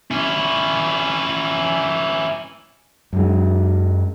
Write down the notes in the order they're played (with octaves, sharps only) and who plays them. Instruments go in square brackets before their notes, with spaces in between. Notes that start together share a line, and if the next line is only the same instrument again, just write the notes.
[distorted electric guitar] C#4 E4
[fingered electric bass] F#2 F#3 G#3